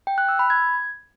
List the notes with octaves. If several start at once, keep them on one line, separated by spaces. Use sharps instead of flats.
G5
F#6
E6
B5
G#6